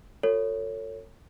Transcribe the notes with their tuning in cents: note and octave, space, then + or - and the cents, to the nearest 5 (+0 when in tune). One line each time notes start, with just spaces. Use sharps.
F#4 -30 A4 +40 C#5 +0